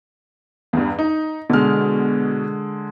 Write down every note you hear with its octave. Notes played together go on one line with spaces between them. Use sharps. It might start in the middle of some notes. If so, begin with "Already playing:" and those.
E2 G2
D#4
B2 D3 G#3 F6